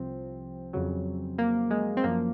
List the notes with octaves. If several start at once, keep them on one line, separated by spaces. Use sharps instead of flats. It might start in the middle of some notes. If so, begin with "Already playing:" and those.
Already playing: C2 C3 F3 C4
F2 C#3 F#3
A#3
G#3
C4
F#2 F3 A#3